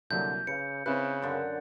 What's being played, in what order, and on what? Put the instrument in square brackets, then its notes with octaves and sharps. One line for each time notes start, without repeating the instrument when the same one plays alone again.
[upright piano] C2 F#3 A#3 [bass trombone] D3 [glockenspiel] G6
[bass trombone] C#3 [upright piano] B4 F5 [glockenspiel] C#7
[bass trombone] C#3 [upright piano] C4 E4 B4 [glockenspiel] F#6
[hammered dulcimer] F#2 D3